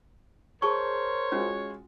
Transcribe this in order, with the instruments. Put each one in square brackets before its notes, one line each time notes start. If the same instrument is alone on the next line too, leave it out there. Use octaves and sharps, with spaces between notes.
[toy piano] G#4 A5 C#6 [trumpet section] A#4 C5 [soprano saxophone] C#5
[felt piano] G#3 F4 F#4 [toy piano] C#4